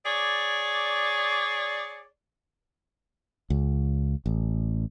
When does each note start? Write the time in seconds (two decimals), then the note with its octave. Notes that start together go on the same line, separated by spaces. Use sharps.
0.06 G#4 C#5 D5
3.50 C#2
4.26 A1